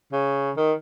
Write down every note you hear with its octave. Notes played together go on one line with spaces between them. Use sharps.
C#3
D#3